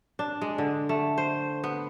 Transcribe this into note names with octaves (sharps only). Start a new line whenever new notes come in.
D4
G#3
D3
A3
C5
B3